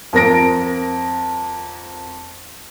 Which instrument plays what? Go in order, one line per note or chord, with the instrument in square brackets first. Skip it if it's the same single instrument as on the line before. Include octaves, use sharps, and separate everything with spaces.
[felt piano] F2 A#4 A#6 D7